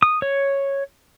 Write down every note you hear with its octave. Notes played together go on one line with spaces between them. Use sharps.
D#6
C#5